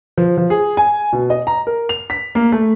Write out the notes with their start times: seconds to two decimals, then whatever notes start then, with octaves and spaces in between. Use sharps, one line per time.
0.18 F3
0.37 F3
0.50 G#4
0.77 G#5
1.13 B2
1.30 D#5
1.47 A#5
1.67 A#4
1.89 F7
2.10 B6
2.35 A#3
2.52 A3